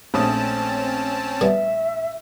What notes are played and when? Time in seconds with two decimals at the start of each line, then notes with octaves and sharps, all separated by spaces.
0.14 A#1 A3 C4 C#4 A5 D#6
1.41 C#3 G3 B3 E5